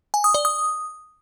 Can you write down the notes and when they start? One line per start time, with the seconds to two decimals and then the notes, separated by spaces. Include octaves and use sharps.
0.14 G#5
0.24 D#6
0.34 D5
0.45 D#6